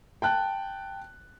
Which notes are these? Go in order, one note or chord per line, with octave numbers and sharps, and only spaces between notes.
G5 A5 F#6